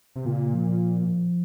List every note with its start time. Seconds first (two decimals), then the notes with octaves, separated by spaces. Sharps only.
0.16 C3
0.25 A#2 C#3
0.53 F3